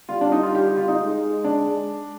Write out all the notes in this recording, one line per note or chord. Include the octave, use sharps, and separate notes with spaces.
G3 F4
D4
D#4
F4
G4
G4
F4
D#4
G#3
D4